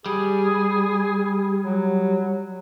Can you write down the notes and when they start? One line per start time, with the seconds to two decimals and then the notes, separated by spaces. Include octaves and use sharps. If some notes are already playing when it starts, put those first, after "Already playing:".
0.06 G3 G#4
1.62 F#3